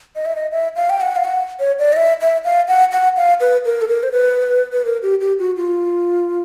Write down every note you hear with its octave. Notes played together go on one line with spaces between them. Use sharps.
D#5
E5
D#5
E5
F5
G5
F#5
F5
F#5
C#5
D5
D#5
E5
E5
F5
F#5
F#5
F5
B4
A#4
A4
A#4
C5
B4
B4
A#4
G4
G4
F#4
F4